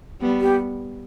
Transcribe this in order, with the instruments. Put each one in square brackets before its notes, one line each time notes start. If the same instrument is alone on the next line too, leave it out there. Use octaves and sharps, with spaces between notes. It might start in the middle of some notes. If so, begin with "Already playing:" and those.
[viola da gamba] G3 B3
[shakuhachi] G4